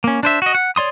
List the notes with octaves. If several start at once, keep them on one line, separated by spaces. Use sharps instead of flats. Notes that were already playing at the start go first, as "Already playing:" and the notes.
A#3 C#4
D4 C5 E5
F#4 D#5
F#5
C#5 D5 C6 D#6